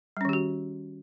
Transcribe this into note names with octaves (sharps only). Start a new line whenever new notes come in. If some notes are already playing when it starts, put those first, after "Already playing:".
D#3 G3 C#4 F#4 G4